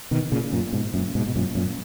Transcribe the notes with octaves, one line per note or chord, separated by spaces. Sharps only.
B2 D#3
A#2 C#3
F#2 A#2
G#2 B2
F#2 A#2
G#2 B2
B2
F#2 A#2
F#2 A#2